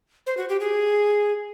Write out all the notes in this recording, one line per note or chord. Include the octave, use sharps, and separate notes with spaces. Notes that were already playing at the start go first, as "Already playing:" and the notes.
C5
F#4
G4
G#4